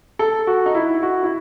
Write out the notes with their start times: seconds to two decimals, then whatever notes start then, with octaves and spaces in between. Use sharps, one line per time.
0.19 A4
0.47 F#4
0.66 D#4
0.75 E4
1.03 F#4
1.23 E4